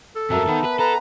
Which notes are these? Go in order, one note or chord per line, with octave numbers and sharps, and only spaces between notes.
A4
F2 F#3 A#4 E5 A5
D#3 B3
B4
A4 B4 A#5